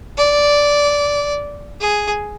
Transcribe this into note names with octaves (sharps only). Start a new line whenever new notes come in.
D5
G#4